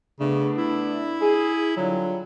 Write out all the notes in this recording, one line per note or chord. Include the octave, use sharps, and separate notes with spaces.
C#3 A3 B3 D4
E4
G#4
D3 F#3 G3 F4